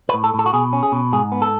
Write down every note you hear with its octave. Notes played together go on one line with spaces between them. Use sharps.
B4
A2
A4
A2 A4
F#4
B2 G#4
C#4
G#4
B2
G#2 G#4
B3
A4